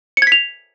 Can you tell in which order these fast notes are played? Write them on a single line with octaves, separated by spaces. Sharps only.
C#7 G#6 B6 F7